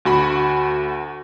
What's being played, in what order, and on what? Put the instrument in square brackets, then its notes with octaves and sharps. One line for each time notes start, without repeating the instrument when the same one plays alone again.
[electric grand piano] D2 F#4 B5